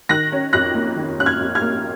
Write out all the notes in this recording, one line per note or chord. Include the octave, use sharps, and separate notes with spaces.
D#3 F#6 A#6
C#4
F2 F#6 A#6
A#3
D#3
C#4 F#6
F6 G#6
F2
F6 G#6
A#3